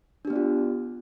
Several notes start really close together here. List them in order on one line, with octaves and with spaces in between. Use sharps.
D4 G4 B3 D5 F4